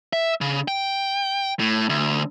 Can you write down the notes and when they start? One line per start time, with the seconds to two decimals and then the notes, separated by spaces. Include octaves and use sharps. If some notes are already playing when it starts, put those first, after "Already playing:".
0.13 E5
0.41 C#3
0.68 G5
1.59 A2
1.89 D2